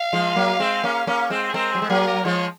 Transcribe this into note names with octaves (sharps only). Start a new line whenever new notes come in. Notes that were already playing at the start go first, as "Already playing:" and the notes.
Already playing: F5
F3 G#3
F#3 A#3
G#3 C4
A#3 C#4
A#3 C#4
G#3 C4
G#4
G#3 C4 A#4
F#3 G#4
G#3
F#3 A#3 G#4
A#4
F3 G#3 C#5